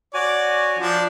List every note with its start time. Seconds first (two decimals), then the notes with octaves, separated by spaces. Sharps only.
0.14 F#4 C#5 D5 G#5
0.79 F3 D4 D5